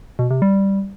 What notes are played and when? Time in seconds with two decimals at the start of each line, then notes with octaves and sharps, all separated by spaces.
0.19 B2
0.30 C3
0.42 G3